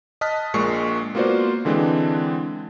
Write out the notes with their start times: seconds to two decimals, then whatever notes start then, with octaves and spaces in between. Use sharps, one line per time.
0.21 D#5 A5 D#6 F6 F#6 B6
0.54 A#1 A#2 G#3 C#6 C7
1.15 A#3 B3 F4 F#4 C5 D5
1.65 D3 E3 G#3 C4 D4